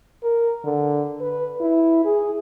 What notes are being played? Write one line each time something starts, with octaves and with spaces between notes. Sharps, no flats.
A#4
D3
B4
E4
G#4